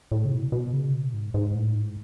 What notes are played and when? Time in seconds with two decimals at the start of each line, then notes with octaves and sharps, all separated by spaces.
0.11 A2
0.25 C#3
0.32 B2
0.52 B2
0.73 C#3
0.93 B2
1.13 G#2
1.34 G#2
1.55 A2
1.75 G#2